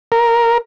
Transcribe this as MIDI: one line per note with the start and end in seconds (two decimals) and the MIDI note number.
0.12 0.58 70